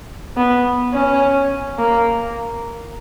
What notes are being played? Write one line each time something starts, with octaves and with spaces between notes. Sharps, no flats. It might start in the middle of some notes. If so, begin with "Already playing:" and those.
B3
C#4
A#3